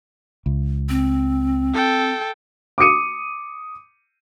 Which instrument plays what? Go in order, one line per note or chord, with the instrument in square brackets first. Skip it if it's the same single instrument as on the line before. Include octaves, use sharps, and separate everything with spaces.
[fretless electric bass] C#2
[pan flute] C4
[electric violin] A4 G5
[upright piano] D6 D#6 C#7 D#7